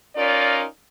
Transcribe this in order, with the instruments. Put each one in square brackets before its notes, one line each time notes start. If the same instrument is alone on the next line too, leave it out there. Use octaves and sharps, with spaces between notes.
[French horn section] C#4 D#4 F4 A#4 D5